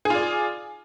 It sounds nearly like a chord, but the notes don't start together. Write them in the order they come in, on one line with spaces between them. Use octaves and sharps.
G#4 F4 D5